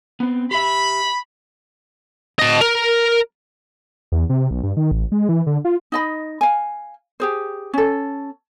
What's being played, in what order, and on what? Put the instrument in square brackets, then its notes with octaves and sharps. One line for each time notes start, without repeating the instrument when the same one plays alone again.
[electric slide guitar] B3 C4
[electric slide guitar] G4 E5 [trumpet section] B5
[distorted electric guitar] D#5 A5
A#4
[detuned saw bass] E2
C3
B1
G2
D#3
A1
G#3
E3
D3
F4
[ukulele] D#4 D#5 B5
F5 G#5
G4 G#4 C5
C#4 A4